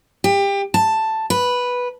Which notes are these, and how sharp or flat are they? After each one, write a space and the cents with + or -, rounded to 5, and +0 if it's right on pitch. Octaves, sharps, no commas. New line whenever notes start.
G4 +25
A5 +5
B4 -5